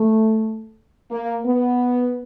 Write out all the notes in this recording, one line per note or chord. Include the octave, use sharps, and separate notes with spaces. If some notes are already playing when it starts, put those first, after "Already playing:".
Already playing: A3
A#3
B3